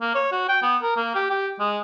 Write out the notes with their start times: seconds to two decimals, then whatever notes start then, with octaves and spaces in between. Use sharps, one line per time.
0.01 A#3
0.15 C#5
0.32 F#4
0.49 G5
0.62 B3
0.83 A#4
0.97 A#3
1.15 G4
1.30 G4
1.59 G#3